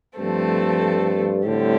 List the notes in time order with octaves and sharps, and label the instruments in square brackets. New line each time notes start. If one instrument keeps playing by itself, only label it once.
[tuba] G2 [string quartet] F3 A3 C4 A4
[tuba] A2 [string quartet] D3 G3 C4 G4